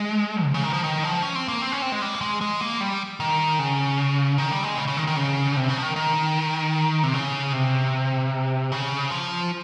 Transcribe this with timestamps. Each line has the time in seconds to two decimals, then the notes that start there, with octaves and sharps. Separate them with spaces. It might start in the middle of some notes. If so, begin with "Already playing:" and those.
Already playing: G#3
0.44 C#3
0.54 C#3
0.63 D#3
0.73 F3
0.84 D#3
1.04 F3
1.23 C#4
1.35 C4
1.48 A#3
1.62 C4
1.72 C#4
1.82 C4
1.92 G#3
2.02 G3
2.14 A#3
2.21 G#3
2.41 G#3
2.61 A#3
2.81 G3
3.20 D#3
3.59 C#3
4.38 D#3
4.51 G3
4.64 G#3
4.77 C#3
4.88 C#3
4.97 D#3
5.07 D#3
5.16 C#3
5.57 C3
5.69 C#3
5.78 F3
5.83 D#3
5.96 D#3
7.03 C3
7.14 C#3
7.53 C3
8.72 C#3
9.11 F3